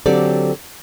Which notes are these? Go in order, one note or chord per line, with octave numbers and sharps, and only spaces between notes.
D3 F#3 C4 G4 A4 D5